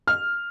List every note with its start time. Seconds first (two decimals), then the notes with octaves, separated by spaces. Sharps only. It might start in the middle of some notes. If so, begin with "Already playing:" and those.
0.07 F6